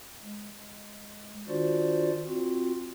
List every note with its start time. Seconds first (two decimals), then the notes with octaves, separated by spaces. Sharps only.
0.23 G#3
1.48 D#3 D4 F4 F#4 C5 D5
2.27 C4 F4 F#4